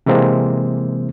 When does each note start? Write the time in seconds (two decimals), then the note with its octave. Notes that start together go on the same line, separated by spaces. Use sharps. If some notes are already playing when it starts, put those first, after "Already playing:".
0.06 C3 E3 G#3 A#3 C4